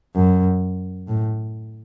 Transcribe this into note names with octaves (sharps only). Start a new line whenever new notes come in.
F#2
A2